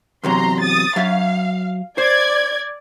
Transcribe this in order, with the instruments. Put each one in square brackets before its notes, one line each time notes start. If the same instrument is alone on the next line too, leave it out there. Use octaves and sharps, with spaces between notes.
[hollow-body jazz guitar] E2 C3 F#3 [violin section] A#5 C6
[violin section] D#6 A6
[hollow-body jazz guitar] F#3 E5 [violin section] F5
[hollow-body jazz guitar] C5 [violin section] D5 G#6